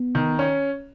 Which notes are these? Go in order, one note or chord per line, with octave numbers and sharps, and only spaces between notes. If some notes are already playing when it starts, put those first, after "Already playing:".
Already playing: B3
D#3
C#4